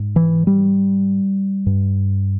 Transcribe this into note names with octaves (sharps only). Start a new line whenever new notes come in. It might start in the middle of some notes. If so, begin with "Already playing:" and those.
Already playing: G#2
E3
G3
G2